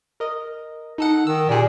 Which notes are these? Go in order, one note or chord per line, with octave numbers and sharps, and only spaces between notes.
A#4 D#5
D#4 A4 F#5
D#3 E6
A#2 G4 G#4